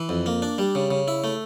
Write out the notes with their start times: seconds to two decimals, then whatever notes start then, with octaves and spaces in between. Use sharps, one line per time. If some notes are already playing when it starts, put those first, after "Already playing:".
Already playing: E3
0.09 F2
0.26 A#3
0.42 D4
0.58 G3
0.75 C#3
0.91 C#3
1.08 E4
1.24 A3